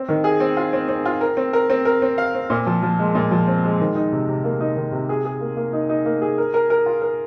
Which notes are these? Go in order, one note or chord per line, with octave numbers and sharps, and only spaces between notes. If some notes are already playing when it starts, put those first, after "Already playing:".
Already playing: C4
D#3
G#4
C4
F4
C4
C4
F4
A#4
C4
A#4
C4
A#4
C4
F5
C4
A#2
F3
F3
G#3
A#2
F3
C4
G#3
D#3
D#4
C3
C3
A#3
D#4
D#3
C3
G#4
G#4
A#3
A#3
D#4
D#4
A#3
G#4
A#4
A#4
A#4
F4
A#4